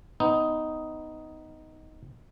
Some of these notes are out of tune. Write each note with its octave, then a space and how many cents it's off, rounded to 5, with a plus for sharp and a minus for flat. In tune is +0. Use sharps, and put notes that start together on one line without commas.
B3 +20 D#4 +5